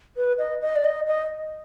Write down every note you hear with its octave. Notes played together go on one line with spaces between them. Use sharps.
B4
D#5
D#5
D5
D#5
D#5